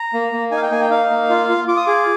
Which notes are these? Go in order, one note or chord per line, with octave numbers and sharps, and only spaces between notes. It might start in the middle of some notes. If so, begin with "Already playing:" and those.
Already playing: A#5
A#3
A#3
D#4 G#5
F5
G5
A#3 G#5
G5
D#4 F5
A#3
F4
F4
F4 D6
D#6
G#4 D6